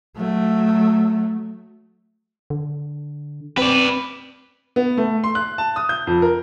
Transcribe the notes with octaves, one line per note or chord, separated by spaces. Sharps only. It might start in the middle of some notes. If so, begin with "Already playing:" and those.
F#3 A3
D3
C4 B4 D5
B3
A3
C6
F#6
A5
D#6
G6
F2
A#4